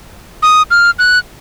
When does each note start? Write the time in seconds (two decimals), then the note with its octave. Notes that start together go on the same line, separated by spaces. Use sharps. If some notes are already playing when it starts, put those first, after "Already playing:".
0.42 D#6
0.71 F6
0.99 F#6